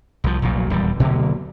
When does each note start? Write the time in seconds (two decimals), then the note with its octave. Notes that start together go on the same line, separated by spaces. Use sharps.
0.24 C2 F3
0.42 F1 B1 A#2 F#3
0.70 D#1 E2 G3
1.00 B2 D3 F#3 A#3